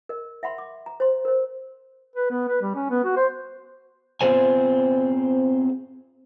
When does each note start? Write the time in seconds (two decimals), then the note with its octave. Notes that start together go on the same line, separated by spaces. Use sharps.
0.09 A#4 D#5
0.43 E5 F#5 B5 C6
0.58 D6
0.86 A#5
1.00 C5 C6
1.25 A#4 C5
2.16 B4
2.30 B3
2.49 B4
2.62 G3
2.75 C#4
2.90 B3
3.04 F#4
3.17 C5
4.21 B3 C4 F4 G#4 C5 G#5